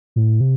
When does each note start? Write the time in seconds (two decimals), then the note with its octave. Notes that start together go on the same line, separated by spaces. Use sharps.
0.16 A2
0.40 C3